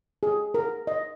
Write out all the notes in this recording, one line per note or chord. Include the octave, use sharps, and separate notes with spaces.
G#4
A#4
D#5